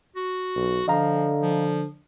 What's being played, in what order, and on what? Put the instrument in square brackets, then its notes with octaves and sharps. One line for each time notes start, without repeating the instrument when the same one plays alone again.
[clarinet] F#4
[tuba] B1
[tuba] D3 [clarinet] F3 [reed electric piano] D#5 F5 A#5
[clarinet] F3